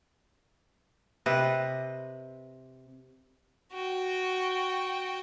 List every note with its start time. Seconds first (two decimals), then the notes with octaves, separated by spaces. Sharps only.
1.26 C3 B4 D#5
3.73 F#4 G5